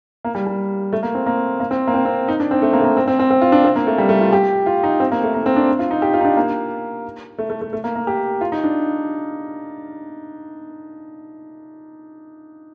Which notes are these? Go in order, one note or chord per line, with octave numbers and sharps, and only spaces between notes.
A#3
G3
G3
A3
A#3
C4
A#3
A#3
C4
A#3
C4
C4
D#4
D4
C4
A3
A#3
A3
A#3
C4
C4
C4
C4
F4
D4
C4
A#3
A3
G3
A3
F4
G4
F4
D#4
C4
A#3
A3
A#3
C4
D4
F4
D#4
G4
F4
D#4
D4
A#3
A3
A3
A3
A3
A#3
A#3
G4
F4
D#4
D4